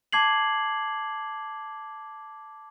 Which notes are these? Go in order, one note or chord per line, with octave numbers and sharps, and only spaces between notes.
A5 D6 G#6 C7 F#7